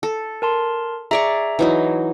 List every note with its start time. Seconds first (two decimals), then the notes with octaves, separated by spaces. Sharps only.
0.03 A4
0.42 A#4 A5 C6
1.11 G#4 D5 E5 A#5 C#6
1.59 E3 F#3 D#4